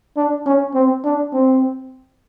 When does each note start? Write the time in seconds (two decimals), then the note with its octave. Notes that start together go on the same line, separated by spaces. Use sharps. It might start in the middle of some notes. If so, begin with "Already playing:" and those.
0.16 D4
0.46 C#4
0.74 C4
1.04 D4
1.33 C4